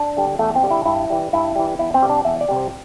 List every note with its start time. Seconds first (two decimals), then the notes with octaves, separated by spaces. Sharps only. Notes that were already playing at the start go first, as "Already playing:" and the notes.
Already playing: D4
0.17 D3 G3
0.39 E2 A3
0.55 C4
0.63 D3 G3
0.71 E4
0.86 G2 E4
1.10 E3 G3
1.33 G2 E4
1.55 E3 G3
1.79 E2 E4
1.94 C4
2.02 C3 G3
2.10 D4
2.25 E2 E5
2.41 D5
2.49 C3 G3
2.56 C5